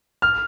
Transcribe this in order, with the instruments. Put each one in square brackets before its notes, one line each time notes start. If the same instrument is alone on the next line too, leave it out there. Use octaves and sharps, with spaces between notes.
[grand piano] F6